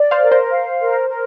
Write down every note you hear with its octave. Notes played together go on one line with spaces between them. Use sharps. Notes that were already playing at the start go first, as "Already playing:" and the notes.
Already playing: D5
C5 F5
A#4
C5
F5
A#4
A#4